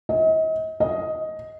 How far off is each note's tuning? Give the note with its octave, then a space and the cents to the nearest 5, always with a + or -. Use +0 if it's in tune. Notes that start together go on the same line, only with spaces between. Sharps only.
D#5 +35
D#5 +10